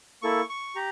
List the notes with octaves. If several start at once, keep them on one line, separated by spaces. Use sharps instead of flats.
A#3 E4 A4 C#6
C#6
G4 A#5